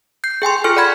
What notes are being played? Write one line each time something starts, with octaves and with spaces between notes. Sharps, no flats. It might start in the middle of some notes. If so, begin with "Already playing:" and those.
G6 C7
G#4 G5 G#5 C6
F4 G#4 A4 F6
D5 F#5 B5 G#6